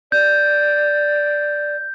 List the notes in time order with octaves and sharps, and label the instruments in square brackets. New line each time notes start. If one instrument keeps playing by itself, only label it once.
[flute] D5 [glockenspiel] G6